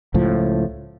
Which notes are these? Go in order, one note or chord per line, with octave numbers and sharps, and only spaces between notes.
C#2 A2 F3